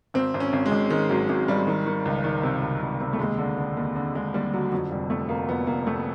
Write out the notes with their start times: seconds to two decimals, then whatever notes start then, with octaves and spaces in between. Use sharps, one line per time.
0.14 G#1 C4
0.34 G#1
0.40 C#4
0.53 G#1
0.66 G#3
0.72 G#1
0.90 D#3 G#3
1.09 G#1 F#3
1.29 G#1 F#3
1.48 G#1 G3
1.67 D#3
1.86 D#3
2.05 C#2
2.24 D#3
2.43 C3
2.62 C#2
2.82 C#2
3.00 C3
3.13 A3
3.19 D#2 G#3
3.38 D3
3.58 D3
3.77 D#2
3.96 D3
4.15 D3 G#3
4.34 D#2 G3
4.53 D3 F#3
4.72 F2 F#3
4.91 F1 G3
5.10 F2 A3
5.29 F1 A#3
5.48 F2 B3
5.67 F1 A#3
5.87 F1 A3